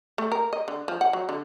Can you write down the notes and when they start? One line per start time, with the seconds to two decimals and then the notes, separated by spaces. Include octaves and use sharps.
0.18 A3
0.32 A#4
0.53 D#5
0.68 D3
0.88 F3
1.01 F#5
1.13 F#3
1.29 D3